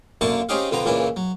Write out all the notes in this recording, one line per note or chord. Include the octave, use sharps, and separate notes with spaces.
F#2 D3 A#3 E4 A5 C#6
C4 C#4 D#4 G4 G#4 F5
F2 D3 B3 C4 A#5
C#2 A#2 E3 C#4 D4 E4
F#3